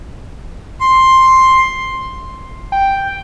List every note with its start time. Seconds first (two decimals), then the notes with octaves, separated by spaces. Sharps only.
0.81 C6
2.72 G5